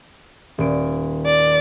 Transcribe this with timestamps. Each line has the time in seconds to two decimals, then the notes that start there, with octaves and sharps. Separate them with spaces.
0.58 D#1 D7
1.26 D5